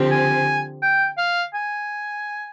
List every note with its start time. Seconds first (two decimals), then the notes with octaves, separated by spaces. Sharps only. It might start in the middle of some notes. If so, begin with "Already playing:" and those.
Already playing: D3 F3 C4 G4
0.11 G#5
0.82 G5
1.18 F5
1.54 G#5